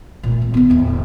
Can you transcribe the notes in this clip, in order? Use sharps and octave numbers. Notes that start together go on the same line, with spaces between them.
A#2 A3
G#1
B3 D#4
D1 E2